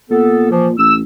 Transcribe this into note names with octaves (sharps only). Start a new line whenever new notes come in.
A#2 B3 A4
E3 F3
A1 E6